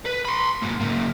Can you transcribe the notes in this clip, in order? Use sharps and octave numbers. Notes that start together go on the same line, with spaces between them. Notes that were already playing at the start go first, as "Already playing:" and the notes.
B4
B5 C6
G#2 A#3
C#3 A#3